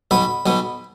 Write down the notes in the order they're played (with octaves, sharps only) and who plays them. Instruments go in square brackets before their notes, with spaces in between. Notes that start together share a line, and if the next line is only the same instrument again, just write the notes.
[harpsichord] B1 B2 B3 B5
B1 B2 B3